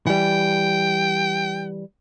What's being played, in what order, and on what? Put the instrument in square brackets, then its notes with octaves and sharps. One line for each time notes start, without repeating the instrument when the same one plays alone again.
[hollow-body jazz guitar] E3 G3 [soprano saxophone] G5